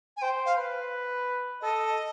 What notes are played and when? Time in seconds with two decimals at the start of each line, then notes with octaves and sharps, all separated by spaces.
0.17 G#5
0.22 C5 G5
0.46 F5
0.57 B4
1.62 A4 D#5